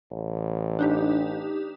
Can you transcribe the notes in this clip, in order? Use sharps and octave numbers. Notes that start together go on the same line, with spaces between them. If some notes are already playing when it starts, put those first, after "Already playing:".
A1
D4 D#4 G4